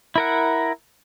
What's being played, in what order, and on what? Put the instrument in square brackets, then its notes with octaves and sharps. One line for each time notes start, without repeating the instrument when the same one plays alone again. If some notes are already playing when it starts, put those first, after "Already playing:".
[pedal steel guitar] E4 A#4 F#5